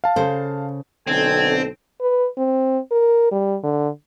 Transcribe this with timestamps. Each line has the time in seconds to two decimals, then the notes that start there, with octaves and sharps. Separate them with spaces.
0.04 F5 A5
0.16 C#3 A4 C5
1.07 B1 D3 C4 A4 G#5
2.01 B4
2.38 C4
2.91 A#4
3.32 G3
3.63 D3